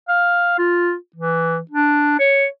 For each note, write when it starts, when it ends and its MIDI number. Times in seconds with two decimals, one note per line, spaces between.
0.09 0.55 77
0.59 0.94 65
1.16 1.59 52
1.71 2.15 62
2.20 2.46 73